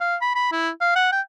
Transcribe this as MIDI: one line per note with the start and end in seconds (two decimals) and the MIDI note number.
0.01 0.16 77
0.22 0.33 83
0.35 0.52 83
0.52 0.69 64
0.81 0.93 77
0.96 1.11 78
1.12 1.21 79